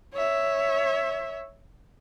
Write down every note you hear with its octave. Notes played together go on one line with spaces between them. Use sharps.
C#5 E5